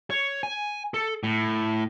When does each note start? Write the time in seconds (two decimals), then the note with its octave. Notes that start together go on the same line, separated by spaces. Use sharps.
0.10 C#5
0.43 G#5
0.94 A4
1.23 A2